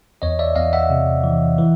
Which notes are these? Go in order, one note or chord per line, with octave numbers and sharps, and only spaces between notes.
E2 C#5 D#5
D5 E5
E2 D#5 F5
E5 F#5
C3
E3
E3